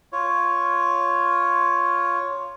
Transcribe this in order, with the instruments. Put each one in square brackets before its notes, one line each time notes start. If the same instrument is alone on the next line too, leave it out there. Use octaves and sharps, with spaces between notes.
[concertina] F4 C#5